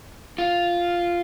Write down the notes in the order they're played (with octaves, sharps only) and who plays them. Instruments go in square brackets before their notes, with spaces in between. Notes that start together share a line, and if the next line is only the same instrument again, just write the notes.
[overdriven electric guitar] F4